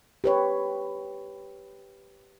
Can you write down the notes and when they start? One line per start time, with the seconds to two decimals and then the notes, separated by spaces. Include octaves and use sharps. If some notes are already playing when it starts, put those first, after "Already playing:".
0.24 G4 B4 C#5